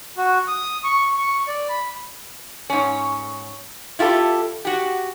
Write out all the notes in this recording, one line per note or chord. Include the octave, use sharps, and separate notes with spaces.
F#4
D#6
C#6
C#6
D5
B5
G#2 C#4
E4 F4 G4 A4
F#4 G4